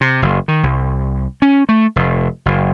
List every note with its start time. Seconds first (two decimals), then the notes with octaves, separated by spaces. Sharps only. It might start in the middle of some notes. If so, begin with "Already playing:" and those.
0.01 C3
0.22 F#1
0.48 D#3
0.63 C2
1.42 C#4
1.69 A3
1.96 F1
2.46 F#1